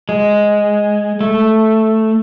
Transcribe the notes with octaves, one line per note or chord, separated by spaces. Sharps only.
G#3
A3